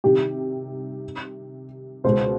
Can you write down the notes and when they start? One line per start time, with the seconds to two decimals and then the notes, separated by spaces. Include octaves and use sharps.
0.04 C3 D#3 G3 G4
2.04 C#2 B2 G#3 C5